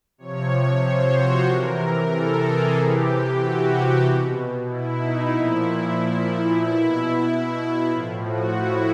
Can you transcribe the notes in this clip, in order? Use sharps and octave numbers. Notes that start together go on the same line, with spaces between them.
C3 F3 C#5
C5
F#4
C3 E3 A#4
A4
G#4
C3 E3 G4
F#4
B2
E4
D#4
A#2 F3 E4
B2 E4
E4
A2 F3 F4
F#4
E4